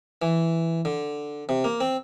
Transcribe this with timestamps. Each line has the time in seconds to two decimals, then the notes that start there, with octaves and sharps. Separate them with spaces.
0.22 E3
0.85 D3
1.49 C3
1.64 A#3
1.81 C4